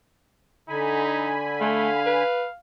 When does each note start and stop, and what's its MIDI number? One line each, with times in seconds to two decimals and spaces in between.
0.69 2.23 50
0.69 1.35 63
0.69 2.23 80
0.69 2.23 83
1.61 1.89 57
1.61 2.59 77
2.06 2.46 71